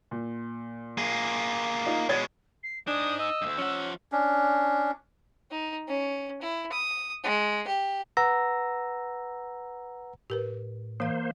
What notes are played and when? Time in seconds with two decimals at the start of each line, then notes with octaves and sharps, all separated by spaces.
0.11 A#2
0.98 A#3 G#4
1.86 D#4 F4
2.09 B2 G#3 C#5 G#6 A6
2.63 C7
2.87 D4 D#4 G#5 D#6
3.19 D#5 E6
3.42 D2 G2
3.58 F3 C#4 F#5
4.12 C#4 D4
5.51 D#4
5.88 C#4
6.41 E4
6.72 D#6
7.24 G#3
7.67 G4
8.17 B4 F#5 A#5 E6 A#6
10.30 A2 G4 A#4 B4
11.00 E3 A#3 C5 F5